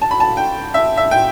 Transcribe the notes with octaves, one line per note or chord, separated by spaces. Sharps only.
A5
B5
A5
G5
E5
E5
G5